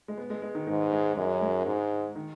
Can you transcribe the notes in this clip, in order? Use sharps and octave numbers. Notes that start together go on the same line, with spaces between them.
G#3
B3
G#3
G#3
D#3
G#2 D#3
G#3
F#2 G#3
G#3
G#2 G#3
D#3